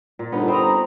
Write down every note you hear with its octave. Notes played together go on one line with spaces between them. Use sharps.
A#2
G1 B3 D4 D#4
C4 A#5 B5 D#6